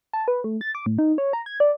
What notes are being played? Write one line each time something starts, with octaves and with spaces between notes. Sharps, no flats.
A5
B4
A3
A6
D6
A2
D#4
C#5
A#5
G#6
D5